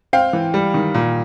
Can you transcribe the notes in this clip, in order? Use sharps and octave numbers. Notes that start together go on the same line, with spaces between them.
C4 F5 G5
E3
G3
D#3
A#2